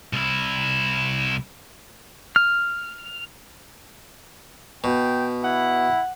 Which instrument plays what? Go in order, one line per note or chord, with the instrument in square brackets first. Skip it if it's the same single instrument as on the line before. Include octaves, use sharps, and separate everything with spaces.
[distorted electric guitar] C2 E4
[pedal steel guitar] F6
[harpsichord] B2 [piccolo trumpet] G5
[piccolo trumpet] E4 [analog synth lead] F#5